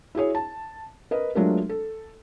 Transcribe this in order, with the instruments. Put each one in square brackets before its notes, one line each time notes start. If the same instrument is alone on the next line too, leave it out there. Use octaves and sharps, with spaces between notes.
[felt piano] E4 F#4 G#4 C#5
A5
A#4 B4 D#5
F#3 G#3 A3 D4 F4 A#4
A4